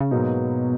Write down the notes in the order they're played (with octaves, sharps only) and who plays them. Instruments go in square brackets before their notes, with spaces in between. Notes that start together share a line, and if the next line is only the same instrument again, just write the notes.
[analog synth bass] C#3
[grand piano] G#2 F#3 A#3 D#4 [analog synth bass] B2